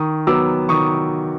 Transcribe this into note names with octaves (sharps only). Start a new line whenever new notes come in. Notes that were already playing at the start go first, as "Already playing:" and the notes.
Already playing: D#3 C#6 D#6
F#3 B3 D6 E6
D#3 C#6 D#6